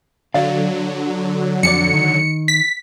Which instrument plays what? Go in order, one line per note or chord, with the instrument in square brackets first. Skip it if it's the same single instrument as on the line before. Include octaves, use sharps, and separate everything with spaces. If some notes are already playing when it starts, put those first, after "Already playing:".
[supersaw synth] D3 F#3 [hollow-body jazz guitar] D5 F5
[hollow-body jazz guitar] F2 G4 D5 [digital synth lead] C#7
[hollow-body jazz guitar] D#3
[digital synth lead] B6